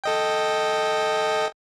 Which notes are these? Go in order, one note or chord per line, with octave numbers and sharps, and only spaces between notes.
A4 D#5 G5